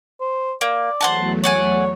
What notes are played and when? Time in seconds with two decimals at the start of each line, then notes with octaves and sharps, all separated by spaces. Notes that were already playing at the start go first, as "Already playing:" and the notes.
0.20 C5
0.61 A#3 D5
1.01 E2 F#3 A3 C5 F#5 A5
1.44 C#5 D5 F#5 G#5